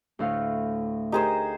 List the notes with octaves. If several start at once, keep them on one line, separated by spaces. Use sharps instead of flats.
D2 A2 F5
D#4 G4 G#4 A#4 C5